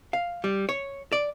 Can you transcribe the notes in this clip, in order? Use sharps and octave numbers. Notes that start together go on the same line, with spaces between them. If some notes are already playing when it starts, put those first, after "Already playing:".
F5
G3
C#5
D5